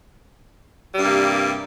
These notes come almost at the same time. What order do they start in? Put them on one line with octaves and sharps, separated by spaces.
G3 G2 C3 A#3